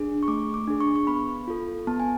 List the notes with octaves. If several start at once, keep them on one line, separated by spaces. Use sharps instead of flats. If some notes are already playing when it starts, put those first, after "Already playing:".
Already playing: D4 G#4
C#6
A3 D6
D6
D4 G#4
C#6
C#6
B3 B5
F4 A4
B3 A5
G#5